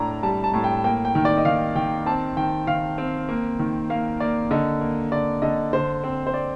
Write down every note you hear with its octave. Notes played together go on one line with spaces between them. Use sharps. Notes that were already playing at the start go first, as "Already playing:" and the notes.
Already playing: A2 D4 A#5
G3 A5
A5
A2
G5
A#3 G5
G5
D#3
D5
D#5
D#3 F5
D#3 G5
C4 A5
D#3 G5
D#3 F5
C4
A#3
D#3
A#3 F5
A#3 D5
D3 D#5
A#3
D3 D5
D3 D#5
D3 C5
C4
C5
D5